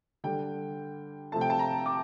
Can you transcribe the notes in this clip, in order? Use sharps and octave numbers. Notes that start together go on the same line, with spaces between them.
D3 G3 G5
C3 F3 A3 A5
G5
A5
A#5
D6